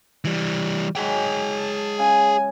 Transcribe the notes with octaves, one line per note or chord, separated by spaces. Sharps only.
E3 G3
F#3 G#3 G#4 G5
A5
C#3 G#5